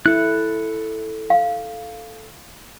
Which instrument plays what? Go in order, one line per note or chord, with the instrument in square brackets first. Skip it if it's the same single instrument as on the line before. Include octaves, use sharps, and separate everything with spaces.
[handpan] E4 [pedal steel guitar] A4 F#6
[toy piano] F5